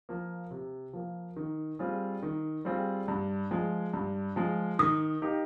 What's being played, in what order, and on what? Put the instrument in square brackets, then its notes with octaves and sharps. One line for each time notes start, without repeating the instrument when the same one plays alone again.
[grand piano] F3 A#3
C3
F3 A#3
D#3
G3 C4 F4 G#4
D#3
G3 C4 F4 G#4
G2
F3 G#3
G2
F3 G#3
[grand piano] D#3 [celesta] D#6
[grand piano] A#3 D#4 G4